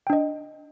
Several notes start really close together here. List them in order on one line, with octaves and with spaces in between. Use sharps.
G5 D4 D#5